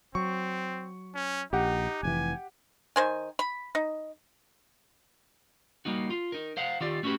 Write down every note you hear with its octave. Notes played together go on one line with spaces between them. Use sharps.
F#3 C4 C#6
C#4
A#1 D#4 G4 F#5
F1 G#2 E3 G#5
D#3 C5 G#5
B5
D#4
G3 A#3 D#4 F#4
F4
D#4 A#4
C5 F5 F#5
D#3 F4 G4 D5
A3 C#4 F#4 G4 B4